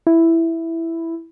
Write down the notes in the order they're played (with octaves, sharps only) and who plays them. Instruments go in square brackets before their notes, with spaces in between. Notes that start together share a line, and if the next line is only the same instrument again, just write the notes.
[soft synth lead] E4